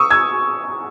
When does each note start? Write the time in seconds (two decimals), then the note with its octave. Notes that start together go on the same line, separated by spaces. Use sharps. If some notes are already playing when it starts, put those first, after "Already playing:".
Already playing: C#6 D#6 E6
0.11 E6 G#6